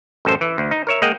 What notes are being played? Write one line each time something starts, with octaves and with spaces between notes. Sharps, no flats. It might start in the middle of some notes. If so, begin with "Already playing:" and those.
A1 F#2 A4 C5
E3
D2
D#4
A#4 C#5 E5
G#3 A#3 D#5 F#5 G5